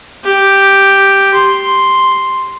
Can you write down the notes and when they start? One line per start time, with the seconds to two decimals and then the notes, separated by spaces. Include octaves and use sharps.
0.24 G4
1.34 C6